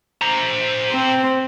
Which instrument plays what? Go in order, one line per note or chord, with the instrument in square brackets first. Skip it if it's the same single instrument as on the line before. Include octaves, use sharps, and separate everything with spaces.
[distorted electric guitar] C5 A#5
[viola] C4